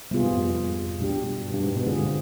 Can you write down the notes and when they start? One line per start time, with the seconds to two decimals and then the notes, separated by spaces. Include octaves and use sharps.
0.11 C3 G3 B3 F4 G#4
0.23 G#2
0.33 F2
0.99 B2 G3 D4 G4
1.43 G2
1.54 G2
1.64 G#2
1.76 B2
1.86 D3 G#3 C4 F4 G#4